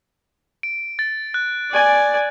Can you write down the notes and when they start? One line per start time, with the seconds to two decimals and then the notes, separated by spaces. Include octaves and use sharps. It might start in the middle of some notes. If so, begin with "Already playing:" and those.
0.63 D7
0.99 A6
1.34 F#6
1.71 D5 G#5